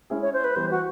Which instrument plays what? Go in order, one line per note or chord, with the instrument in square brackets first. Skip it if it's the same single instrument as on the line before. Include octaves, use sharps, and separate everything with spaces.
[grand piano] G#3 C#4 E4 G#4
[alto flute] C#5
C5
B4
[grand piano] E3 G3 B3 [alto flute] C5
[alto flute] F#4